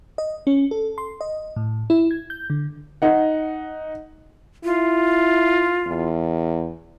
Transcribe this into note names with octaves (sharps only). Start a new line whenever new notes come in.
D#5
C#4
A4
C6
D#5
A2
E4
G#6
G6
D3
D#4 F#5
E4 F4
E2